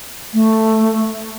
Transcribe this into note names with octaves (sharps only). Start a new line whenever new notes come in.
A3